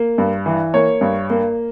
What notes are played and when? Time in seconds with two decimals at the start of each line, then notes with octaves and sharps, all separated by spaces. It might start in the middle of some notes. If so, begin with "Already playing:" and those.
Already playing: A#3
0.18 G2
0.46 E3
0.74 A#3 C#5
1.01 G2
1.30 A#3